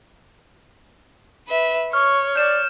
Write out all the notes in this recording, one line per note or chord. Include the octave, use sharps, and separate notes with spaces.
B4 E5
C#5 C#6 F6
D5 G6 E7